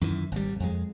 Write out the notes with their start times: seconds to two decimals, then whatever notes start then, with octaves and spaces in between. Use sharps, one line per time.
0.01 F#2 D#3 E3
0.32 G#1 G3
0.60 F2 G#3